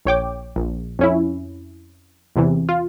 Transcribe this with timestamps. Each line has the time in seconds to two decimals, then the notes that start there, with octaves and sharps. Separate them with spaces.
0.05 A#1 C#5 G5 D6
0.56 A#1
0.99 F2 C#4 E4
2.36 E2 C3 E3
2.69 F4